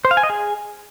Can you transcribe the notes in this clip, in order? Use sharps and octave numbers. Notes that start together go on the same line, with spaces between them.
C5
F5
G#5
D#5
G#4